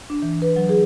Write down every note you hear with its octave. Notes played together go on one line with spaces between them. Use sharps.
D4
E3
B4
F#3
G#4